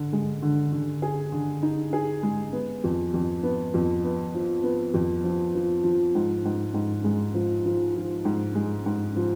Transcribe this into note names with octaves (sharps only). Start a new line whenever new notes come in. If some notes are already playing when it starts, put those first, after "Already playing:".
Already playing: D3
G#3
D3
D3
G#4
D3
D#4
G#4
G#3
B3
F2
F2
B3
F2
B3
F3
B3
F2
F3
F3
F3
G#2
G#2
G#2
G#3
F3
F3
F3
G#2
G#3
G#2
F3